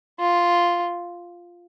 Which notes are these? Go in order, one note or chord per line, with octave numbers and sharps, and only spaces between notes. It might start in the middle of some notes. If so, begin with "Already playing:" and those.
F4